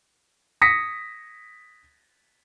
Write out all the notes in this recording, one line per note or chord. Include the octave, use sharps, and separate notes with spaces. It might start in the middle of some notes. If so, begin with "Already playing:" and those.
D#6 A#6 B6 C#7